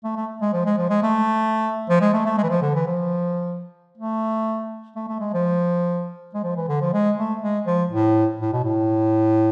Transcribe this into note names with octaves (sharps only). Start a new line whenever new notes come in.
A3
A3
G#3
F3
G#3
F3
G#3
A3
F3
G#3
A3
A3
G#3
E3
F3
D3
E3
F3
A3
A3
A3
G#3
F3
G#3
F3
E3
D3
F3
G#3
A3
G#3
F3
A2
A2
B2
A2